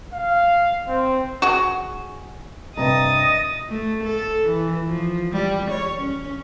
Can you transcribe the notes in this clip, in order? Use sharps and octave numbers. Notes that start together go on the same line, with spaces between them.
F5
C4
F#4 G#4
G2 C3 D#5 A#5 D#6 A6
A3
A4
E3
F3
G3
C#5
C#4